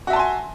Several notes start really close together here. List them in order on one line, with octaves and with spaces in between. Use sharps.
F#4 E5 A5 C6 G#5